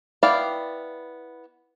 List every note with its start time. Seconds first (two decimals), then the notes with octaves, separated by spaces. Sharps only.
0.23 B3 E4 D5 F5 G5